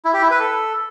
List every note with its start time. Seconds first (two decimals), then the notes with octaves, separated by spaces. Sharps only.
0.05 E4
0.14 G4
0.22 E4
0.31 B4
0.39 A4